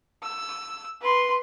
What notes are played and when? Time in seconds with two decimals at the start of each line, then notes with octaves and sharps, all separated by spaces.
0.23 E6
1.02 B4 C6